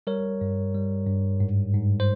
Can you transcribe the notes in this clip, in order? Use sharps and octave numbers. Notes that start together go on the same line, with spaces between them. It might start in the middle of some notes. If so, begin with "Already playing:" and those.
G3 A#4 C#5
G2
G3
G2
G#2
G#2
C5